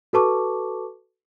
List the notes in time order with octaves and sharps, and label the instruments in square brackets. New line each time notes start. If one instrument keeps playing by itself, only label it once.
[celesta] F#4 A4 B4 A5 C#6 D6